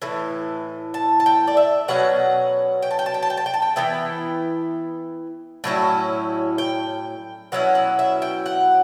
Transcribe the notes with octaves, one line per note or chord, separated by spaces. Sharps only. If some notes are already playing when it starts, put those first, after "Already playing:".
A2 E3
A5
A5
G5
D5
E5
B2 F#3 C#4 F#5
G5
A5
G5
A5
G5
A5
G5
A5
G5
A5
G5
E3 B3 E4 G5
A2 F#3 C#4 E4
G5
B2 F#3 C#4 E4 F#5
F#5
E5
G5
F#5